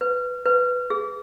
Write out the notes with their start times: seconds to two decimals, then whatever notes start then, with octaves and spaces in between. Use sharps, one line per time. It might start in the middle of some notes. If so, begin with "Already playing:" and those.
0.01 B4
0.46 B4
0.90 G#4